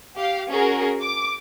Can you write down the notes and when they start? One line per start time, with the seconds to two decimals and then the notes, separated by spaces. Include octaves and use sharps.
0.16 G4 F5
0.51 C#4 F#4 G#4 A#4
1.02 D6